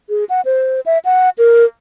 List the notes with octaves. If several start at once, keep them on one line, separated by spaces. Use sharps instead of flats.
G#4
F#5
C5
E5
F#5
A#4